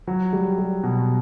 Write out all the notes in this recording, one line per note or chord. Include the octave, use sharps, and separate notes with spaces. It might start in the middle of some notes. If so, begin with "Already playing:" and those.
F#3
G3
G3
B2